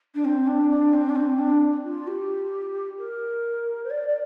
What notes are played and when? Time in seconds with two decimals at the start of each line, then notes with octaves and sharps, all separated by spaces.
0.15 D4
0.25 C4
0.47 D4
0.71 D4
0.94 C4
1.09 D4
1.16 C4
1.39 D4
1.85 F4
2.08 G4
2.99 A#4
3.84 C5
3.91 D5
4.08 D5